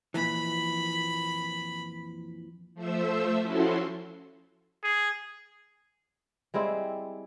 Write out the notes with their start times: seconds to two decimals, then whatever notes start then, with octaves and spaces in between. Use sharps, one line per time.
0.14 F2 A#2 E3 B5
2.74 F3 A3 C5 E5 E6
3.41 F3 C#4 E4 F#4 A4 C6
4.84 G#4
6.54 G3 G#3 C4 E4